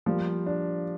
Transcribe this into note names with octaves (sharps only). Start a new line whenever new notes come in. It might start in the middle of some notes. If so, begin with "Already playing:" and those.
F3 G3 A#3
D4